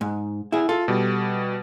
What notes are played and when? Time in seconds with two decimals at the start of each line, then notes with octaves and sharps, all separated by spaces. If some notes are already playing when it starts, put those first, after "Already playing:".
0.01 G#2
0.52 E4 G#4
0.69 F4 A4
0.88 B2 G3